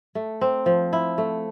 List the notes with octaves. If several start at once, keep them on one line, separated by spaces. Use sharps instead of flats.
A3
C4
F3
E4
A3